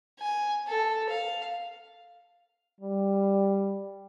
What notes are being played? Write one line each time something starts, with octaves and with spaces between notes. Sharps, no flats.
G#5
A4
F5
G3